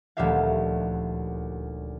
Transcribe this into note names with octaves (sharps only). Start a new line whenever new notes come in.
D#1 D2 F3 G4 E5 F5